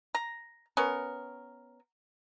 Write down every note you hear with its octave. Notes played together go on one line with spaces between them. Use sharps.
A#5
B3 C#4 A#4